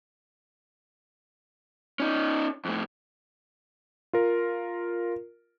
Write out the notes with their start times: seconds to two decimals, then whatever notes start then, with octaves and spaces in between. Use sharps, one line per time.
2.00 C#4 D#4
2.65 F2 A2
4.13 F4 A#4